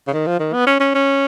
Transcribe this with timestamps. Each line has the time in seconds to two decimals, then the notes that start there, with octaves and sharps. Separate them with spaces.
0.08 C#3
0.13 D#3
0.27 F3
0.40 D#3
0.53 B3
0.66 C#4
0.80 C#4
0.94 C#4